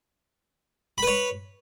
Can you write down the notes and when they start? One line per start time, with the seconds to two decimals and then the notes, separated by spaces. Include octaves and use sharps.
0.98 B5
1.03 B4
1.07 C#5